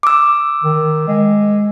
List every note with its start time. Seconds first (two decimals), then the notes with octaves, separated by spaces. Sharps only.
0.03 D6 E6
0.64 D#3
1.08 G#3